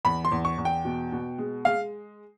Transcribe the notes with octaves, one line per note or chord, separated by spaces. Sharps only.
E2 B5
C6
E2
C#6
E2
G5
B2
B2
G#3
G#3 F5